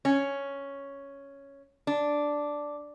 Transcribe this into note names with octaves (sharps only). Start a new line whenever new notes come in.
C#4
D4